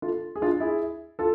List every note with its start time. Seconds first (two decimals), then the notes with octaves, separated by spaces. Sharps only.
0.02 F4 A4
0.36 G#4
0.42 D4 F4
0.60 E4 G#4
1.19 F4 A4